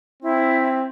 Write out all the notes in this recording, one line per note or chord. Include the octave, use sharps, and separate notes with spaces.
C4 E4